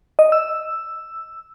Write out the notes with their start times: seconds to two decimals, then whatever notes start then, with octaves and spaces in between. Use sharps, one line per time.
0.19 D#5
0.32 E6